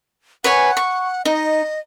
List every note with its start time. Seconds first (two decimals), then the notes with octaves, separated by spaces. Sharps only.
0.44 B4 C#5 F#5 G#5
0.77 C#6
1.25 D#4 D#5